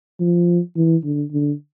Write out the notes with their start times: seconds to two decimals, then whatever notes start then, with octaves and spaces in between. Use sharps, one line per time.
0.20 F3
0.76 E3
1.04 D3
1.32 D3